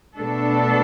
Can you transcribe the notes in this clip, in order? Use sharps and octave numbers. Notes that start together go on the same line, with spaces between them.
B2 A3 D4 A4